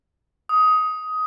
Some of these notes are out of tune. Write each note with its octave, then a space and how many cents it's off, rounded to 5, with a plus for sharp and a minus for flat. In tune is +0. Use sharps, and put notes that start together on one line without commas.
D#6 +15